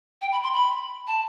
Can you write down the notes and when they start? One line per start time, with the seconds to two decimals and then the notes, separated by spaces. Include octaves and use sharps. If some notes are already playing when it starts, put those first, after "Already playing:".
0.22 G5
0.32 B5
0.43 C6
0.53 B5
1.07 A5